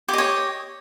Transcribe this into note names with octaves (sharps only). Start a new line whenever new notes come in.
G4 C#5 D#5